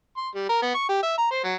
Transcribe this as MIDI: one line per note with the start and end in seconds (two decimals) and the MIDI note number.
0.17 0.29 84
0.35 0.44 55
0.49 0.60 70
0.62 0.72 59
0.74 0.89 85
0.89 0.98 67
1.03 1.13 76
1.18 1.27 82
1.31 1.42 72
1.44 1.54 54